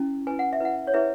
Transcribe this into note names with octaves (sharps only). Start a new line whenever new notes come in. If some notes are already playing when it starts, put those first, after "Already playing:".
Already playing: C#4 E4
E4 B4 G#5
F#5
E5
E4 B4 F#5
C#5
E4 G#4 B4 E5